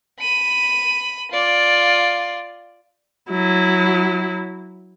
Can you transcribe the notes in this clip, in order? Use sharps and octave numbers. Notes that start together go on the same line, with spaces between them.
B5 D#7
F4 D5
F#3 E4